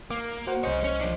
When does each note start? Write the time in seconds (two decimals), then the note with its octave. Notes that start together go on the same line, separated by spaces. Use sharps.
0.11 A#3 D6
0.47 F#4 C5 F#5
0.64 C2 G#4 C5 C#5 D#5
0.84 C#4 C#5
1.01 F3 D4